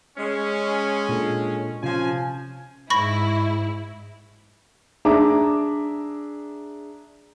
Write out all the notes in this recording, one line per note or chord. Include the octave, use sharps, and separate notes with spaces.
G#3 C#4
A#2 D4 A4
C3 F3 C#4 F4 G#5
G#2 E4 B5 C#6 A#6
D4 G#4 E5 A#5 D6